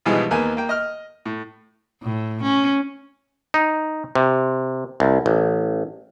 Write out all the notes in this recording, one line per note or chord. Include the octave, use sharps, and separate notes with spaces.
G#2 B2 E3 F3 G3 G#3
D#2 A#3 B3 G#5
A#3 G5
D#5 F6
A2
A2
C#4
D#4
C3
C2
A1